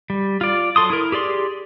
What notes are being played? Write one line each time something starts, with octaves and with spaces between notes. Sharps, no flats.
G3
F4 D5
F#3 A4 C6 D#6
E4 A#4
G4 G#4 D5 C6